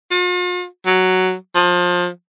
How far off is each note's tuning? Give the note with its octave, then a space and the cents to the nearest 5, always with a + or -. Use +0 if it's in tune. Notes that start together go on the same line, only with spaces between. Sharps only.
F4 +45
F#3 +5
F3 +25